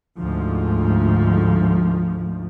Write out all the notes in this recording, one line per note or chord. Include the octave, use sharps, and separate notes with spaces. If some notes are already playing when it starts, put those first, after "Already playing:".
D2 G#2 F3